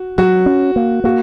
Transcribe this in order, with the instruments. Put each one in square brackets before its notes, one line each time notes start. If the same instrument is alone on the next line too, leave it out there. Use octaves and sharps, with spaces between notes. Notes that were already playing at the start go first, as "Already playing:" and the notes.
Already playing: [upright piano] F#4
[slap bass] F#3 [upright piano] F#4
[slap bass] C#4
A#3
[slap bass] A#3 [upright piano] F#4